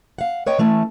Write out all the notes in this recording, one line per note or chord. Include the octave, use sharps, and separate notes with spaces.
F5 F#5
B4 C#5 D#5 G5
E3 A3 C#4 A5